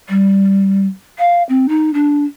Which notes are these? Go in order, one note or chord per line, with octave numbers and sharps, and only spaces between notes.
G3
F5
C4
D#4
D4